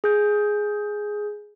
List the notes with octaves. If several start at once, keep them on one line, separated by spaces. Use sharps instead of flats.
G#4 G6